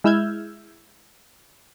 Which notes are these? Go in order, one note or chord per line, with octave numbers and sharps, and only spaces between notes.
G#3 E4 E6 F6 G6 G#6